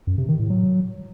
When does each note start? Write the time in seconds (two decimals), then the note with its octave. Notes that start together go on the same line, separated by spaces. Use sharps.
0.07 F#2
0.18 C3
0.29 D#3
0.39 A2
0.50 F#3